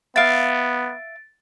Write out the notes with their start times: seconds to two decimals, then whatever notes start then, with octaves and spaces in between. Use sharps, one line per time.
0.16 B3 E5 F5 A6 D7